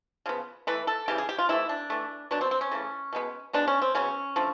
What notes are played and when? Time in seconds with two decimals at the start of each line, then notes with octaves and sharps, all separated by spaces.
0.26 C#3 F3 B3
0.67 E3 A3 B4
0.87 A4
1.08 C#3 E3 G3 G4
1.18 G#4
1.29 G4
1.38 F4
1.49 C3 E3 A3 E4
1.69 D4
1.90 E3 A3
2.31 B2 F#3 B3 D4
2.41 C4
2.51 C4
2.61 C#4
2.71 C#3 E3 A3
3.13 B2 G#3 B3
3.53 B2 G#3 B3 D4
3.67 C#4
3.81 C4
3.95 C#3 F#3 B3 C#4
4.36 D3 F3 A3